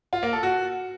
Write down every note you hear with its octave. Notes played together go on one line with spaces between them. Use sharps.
F4
A#3
A4
F#4